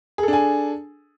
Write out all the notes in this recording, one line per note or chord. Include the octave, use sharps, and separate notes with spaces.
D4 G#4 A4 G#5